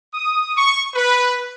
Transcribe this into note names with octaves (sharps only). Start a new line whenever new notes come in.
D#6
C#6
B4